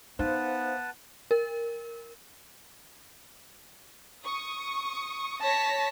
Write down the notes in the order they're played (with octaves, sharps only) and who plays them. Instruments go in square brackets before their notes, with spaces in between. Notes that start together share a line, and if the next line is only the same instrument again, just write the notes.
[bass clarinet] B3 [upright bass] D#4 [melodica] B4 F#5 A5 [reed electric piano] C5 F5
[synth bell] A#4
[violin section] C#6 D#6
[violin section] C#5 A#6 B6 [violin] A5